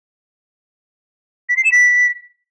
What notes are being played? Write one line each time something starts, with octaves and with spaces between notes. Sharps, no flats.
B6
C7
E7
B6